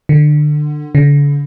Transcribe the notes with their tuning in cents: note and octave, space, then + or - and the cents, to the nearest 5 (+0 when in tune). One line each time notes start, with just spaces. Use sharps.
D3 +25
D3 -35